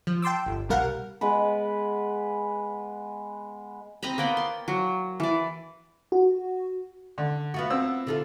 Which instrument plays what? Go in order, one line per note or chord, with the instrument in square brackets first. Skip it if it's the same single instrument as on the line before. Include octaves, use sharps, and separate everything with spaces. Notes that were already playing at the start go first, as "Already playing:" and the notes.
[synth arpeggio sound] F3
G5 A5 C6 D6 E6
G1
C2 B2 G3 A#4 F5 F#5
[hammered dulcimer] G#3 B3 B4
[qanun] C4 D#5 A#5 B5
A#3 B3 D5 G5
C6
F#3
E3 D5
[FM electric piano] F#4
[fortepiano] D3
[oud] B3 F4 F#4
[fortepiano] C4 E6
[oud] D3 F4 A4